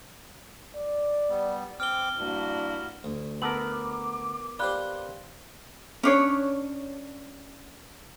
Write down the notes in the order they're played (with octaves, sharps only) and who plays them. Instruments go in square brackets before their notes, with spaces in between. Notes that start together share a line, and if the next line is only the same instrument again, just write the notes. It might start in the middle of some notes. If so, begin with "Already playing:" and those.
[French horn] D5
[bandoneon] G3 B3
[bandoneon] C4 D6 [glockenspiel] F6 G7
[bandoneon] G2 [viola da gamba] A#3 E4 F#4 [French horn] D4
[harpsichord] D2
[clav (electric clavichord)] B3 A#4 [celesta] A5 E6 F#7 [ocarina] D6
[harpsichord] F4 G4 C5 [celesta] D5 B5 F#6
[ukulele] C#4 D4 C#5